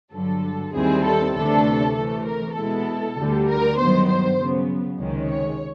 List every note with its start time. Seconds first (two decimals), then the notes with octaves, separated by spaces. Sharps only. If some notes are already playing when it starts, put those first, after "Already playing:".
0.13 G2 D3 F#3 A4
0.74 D#2 D#3 G3 C4 E4 G#4
1.04 A4
1.34 D2 C3 E3 A3 D4 A4
1.95 C3 E3 A3 A4
2.25 A#4
2.56 B2 G#3 B3 E4 A4
3.16 D2 D3 G3
3.47 A#4
3.77 G2 D#3 F#3 B3 C5
4.08 C5
4.38 C#3 F#3 B3
4.99 C#2 C3 D#3 G#3 C#4
5.29 C#5